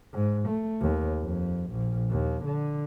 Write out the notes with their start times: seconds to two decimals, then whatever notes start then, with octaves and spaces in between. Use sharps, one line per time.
0.13 G#2
0.48 A3
0.81 D#2
1.21 F2
1.71 A#1
2.11 D#2
2.45 D3